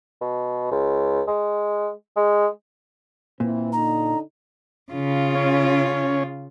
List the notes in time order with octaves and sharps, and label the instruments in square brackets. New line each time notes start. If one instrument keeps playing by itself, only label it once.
[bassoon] B2
C#2
G#3
G#3
[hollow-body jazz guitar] A#2 [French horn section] E3 C4
[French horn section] D3 D#4 [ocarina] A#5
[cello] C#3 F4
[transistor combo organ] C#4